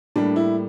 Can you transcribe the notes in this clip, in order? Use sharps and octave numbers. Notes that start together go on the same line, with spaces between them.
A2 G3 A#3 D4
E4